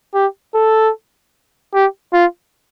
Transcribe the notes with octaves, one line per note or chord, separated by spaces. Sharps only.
G4
A4
G4
F4